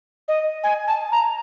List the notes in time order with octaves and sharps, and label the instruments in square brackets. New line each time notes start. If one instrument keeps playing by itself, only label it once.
[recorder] D#5
G#5
A5
A#5